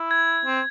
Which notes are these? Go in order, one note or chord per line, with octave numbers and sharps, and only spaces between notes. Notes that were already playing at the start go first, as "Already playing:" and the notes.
Already playing: E4
G#6
C4